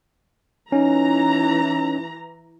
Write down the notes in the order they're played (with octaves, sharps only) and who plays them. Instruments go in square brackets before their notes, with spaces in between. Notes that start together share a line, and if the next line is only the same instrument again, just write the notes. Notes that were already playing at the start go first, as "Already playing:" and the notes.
[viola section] E3 A#5 [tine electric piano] C#4 D#4